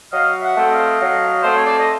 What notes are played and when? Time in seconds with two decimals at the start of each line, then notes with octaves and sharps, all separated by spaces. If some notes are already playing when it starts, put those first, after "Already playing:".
0.12 F#3 D#5 F5
0.42 E5 F#5
0.57 A3 C4
0.71 D#5 F5
1.00 F#3
1.41 A3 C4 C5
1.53 C#5
1.64 D5
1.77 D#5